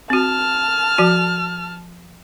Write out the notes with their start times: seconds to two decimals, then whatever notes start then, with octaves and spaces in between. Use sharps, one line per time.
0.10 C4 F#4 A5 F6
0.98 F3 F#4